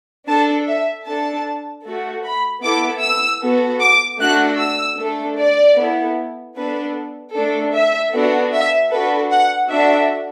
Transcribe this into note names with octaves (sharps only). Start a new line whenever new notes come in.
D4 A4 A5
E5
D4 A4 A5
A3 F#4 A4
B5
B3 E4 A4 D6
E6
B3 F#4 A4
D6
A3 D4 F#4 A4 F#6
E6
A3 D4 A4
D5
B3 E4 A4
B3 D4 A4 B4
A3 D4 A4
E5
B3 D4 F#4 A4
E5
D4 F#4 A4 B4
F#5
D4 F#4 A4 E5